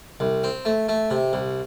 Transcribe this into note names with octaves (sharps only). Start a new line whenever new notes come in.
C2
C4
A3
A3
C3
C2